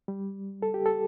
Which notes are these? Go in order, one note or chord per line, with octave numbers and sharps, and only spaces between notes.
G3
A4
G4
A4